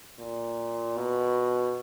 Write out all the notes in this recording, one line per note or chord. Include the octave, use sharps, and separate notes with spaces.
A#2
B2